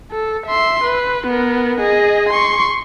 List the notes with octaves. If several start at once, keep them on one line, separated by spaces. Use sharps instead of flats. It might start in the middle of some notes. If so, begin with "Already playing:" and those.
A4
E5 C6
B4
B3 A#4
G#4 D#5
C6 C#6